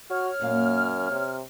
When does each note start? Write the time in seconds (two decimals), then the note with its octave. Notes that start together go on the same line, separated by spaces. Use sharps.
0.10 F#4 C#5 F6
0.41 F#2 A#2 A#3 F5
1.11 C3